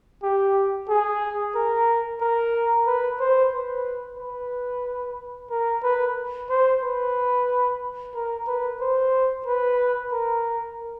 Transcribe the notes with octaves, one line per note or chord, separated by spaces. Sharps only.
G4
G#4
A#4
A#4
B4
C5
B4
B4
A#4
B4
C5
B4
A#4
B4
C5
B4
A#4